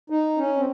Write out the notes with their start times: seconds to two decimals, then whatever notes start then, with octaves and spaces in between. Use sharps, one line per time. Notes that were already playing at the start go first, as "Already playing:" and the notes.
0.10 D#4
0.38 C#4
0.57 C4